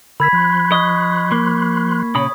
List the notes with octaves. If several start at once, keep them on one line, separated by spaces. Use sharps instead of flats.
D3 A#4 B5 E6 G#6 B6
F3 C6 F#6
D#5 C#6
A#3
A#2 C#3 C#5 B5 D#6